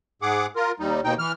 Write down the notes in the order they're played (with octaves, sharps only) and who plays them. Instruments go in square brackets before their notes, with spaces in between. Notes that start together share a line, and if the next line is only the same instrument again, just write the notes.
[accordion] G#2 G#4 F#5 D6
F4 A#4
D#2 G3 D#4
D#2 B2 D#4 G5
E3 F6